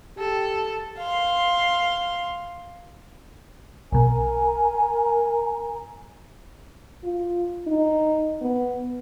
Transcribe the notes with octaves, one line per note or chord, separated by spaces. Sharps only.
G4 A4
F5 C6
B1 B2 A#4 G#5 A#5
F4
D#4
B3